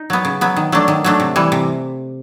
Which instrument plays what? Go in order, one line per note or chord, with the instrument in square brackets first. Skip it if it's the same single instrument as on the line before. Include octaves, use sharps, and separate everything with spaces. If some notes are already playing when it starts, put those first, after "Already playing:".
Already playing: [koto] D#4
F#3 B3
C#3
F#3 B3
D#3
F#3 A3 D4
D#3
F#3 A3 D4
C3
E3 G3
C3